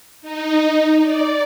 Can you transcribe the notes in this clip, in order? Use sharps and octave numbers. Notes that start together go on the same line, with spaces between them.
D#4
D5